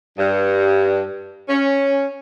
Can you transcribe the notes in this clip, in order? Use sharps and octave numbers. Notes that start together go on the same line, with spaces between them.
G2
C#4